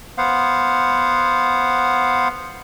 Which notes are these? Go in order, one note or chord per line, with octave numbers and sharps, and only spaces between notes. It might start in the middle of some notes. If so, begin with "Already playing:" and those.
B3 C5 F5 F#5